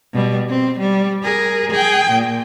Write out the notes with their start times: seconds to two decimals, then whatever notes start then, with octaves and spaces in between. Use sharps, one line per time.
0.13 B2 G3
0.49 C4
0.79 G3
1.23 G#4 A#4
1.70 G#4 G5
2.11 A#2